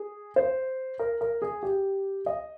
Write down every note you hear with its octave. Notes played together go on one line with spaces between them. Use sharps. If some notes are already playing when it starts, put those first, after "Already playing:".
Already playing: G#4
C5
A#4
A#4
G#4
G4
D#5